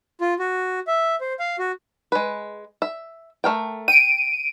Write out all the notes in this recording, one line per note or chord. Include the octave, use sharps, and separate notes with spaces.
F4
F#4
E5
C5
F5
F#4
G#3 B4
E5
A3 A#4 G5
G5 D7 D#7